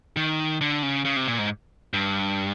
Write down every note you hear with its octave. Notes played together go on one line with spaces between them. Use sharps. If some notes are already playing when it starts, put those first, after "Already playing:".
D#3
D3
C#3
C#3
C3
A#2
G#2
G2